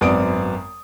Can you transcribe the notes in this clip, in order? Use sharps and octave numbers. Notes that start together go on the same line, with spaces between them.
G#1 F#2 B3 D5 D#6 D7